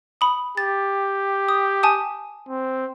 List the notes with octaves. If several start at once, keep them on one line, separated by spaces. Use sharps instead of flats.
B5 D#6
G4 A6
D#6
G#5 A5 D#6
C4